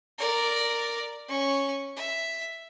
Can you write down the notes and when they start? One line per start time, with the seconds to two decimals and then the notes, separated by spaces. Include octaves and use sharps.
0.18 A#4 D5
1.28 C#4 C#6
1.96 E5